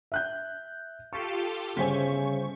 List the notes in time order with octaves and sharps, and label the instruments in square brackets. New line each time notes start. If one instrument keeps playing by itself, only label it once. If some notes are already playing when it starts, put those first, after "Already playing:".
[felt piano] E5 F#6 G6
[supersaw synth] F4 G4 A4 [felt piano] C#6
[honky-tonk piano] G1 C5 G#5 [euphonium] C#3 [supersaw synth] C#6 [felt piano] B6